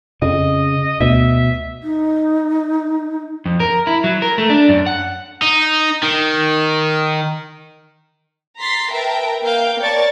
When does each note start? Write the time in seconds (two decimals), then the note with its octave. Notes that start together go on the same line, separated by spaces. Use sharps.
0.22 F2 C#3 D#5
1.00 D2 B2 E5
1.83 D#4
3.46 F2
3.60 A#4
3.87 E4
4.04 F#3
4.22 A#4
4.38 A3
4.49 D4
4.69 F#2
4.86 F#5
5.42 D#4
6.03 D#3
8.58 A#5 C6 A6 B6 C7
8.91 A#4 B4 E5 G5 A5 A#5
9.42 A#3 F5 G5 G6
9.80 A#4 C#5 D5 A5 C#6 A6